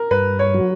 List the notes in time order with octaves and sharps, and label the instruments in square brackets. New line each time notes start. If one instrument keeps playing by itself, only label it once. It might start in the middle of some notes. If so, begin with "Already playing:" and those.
Already playing: [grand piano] A#4
[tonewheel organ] G2 [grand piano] B4
[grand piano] C#5
[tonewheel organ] F#3